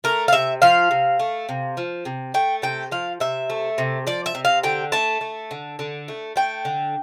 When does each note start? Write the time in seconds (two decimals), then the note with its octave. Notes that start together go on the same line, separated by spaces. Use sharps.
0.04 A3 A#4
0.28 F5
0.33 C3 E5
0.62 F3 F5
0.91 C3
1.19 A3
1.49 C3
1.77 F3
2.05 C3
2.34 A3 G5
2.62 C3 G5
2.91 F3 F5
3.20 C3 E5
3.50 A3
3.78 C3
4.07 F3 D5
4.26 E5
4.35 C3
4.45 F5
4.63 D3 G5
4.92 A3 A5
5.21 A3
5.51 D3
5.79 D3
6.08 A3
6.36 A3 G5
6.65 D3